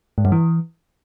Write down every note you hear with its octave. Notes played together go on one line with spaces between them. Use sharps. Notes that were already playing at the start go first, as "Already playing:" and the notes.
G#2
G2
E3